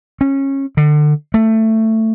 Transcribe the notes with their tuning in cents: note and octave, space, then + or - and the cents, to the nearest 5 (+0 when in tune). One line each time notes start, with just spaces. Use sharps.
C#4 -20
D3 +30
A3 +15